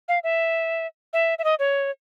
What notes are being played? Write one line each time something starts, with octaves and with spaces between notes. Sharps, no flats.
F5
E5
E5
E5
D#5
C#5